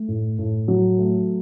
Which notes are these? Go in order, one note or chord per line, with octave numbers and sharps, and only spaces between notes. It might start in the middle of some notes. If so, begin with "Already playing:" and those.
Already playing: A3
A2
A2
F#3
A3